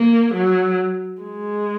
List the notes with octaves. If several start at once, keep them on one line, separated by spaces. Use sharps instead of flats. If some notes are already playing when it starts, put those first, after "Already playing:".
Already playing: A#3
F#3
G#3